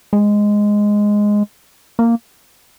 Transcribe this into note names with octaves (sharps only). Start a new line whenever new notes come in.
G#3
A#3